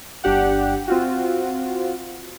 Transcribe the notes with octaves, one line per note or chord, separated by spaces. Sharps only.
G1 D4 G4 F#5
C4 F4 F#4